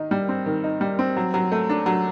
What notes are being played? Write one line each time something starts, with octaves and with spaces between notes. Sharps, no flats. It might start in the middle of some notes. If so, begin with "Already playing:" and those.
Already playing: D#3 D#4
G3
C4
D#3
D#4
G3
C4
F#3
F#3
A3
D4
F#3